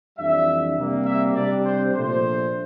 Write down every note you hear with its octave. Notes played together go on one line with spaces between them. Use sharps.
F2 E3 G3 D4 E5
C3 G3 A#3
E5
C3 G3 D4 D5
C5
A#2 F3 A3 D4 C5